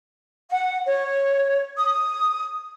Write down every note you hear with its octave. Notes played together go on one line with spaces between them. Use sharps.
F#5
C#5
D#6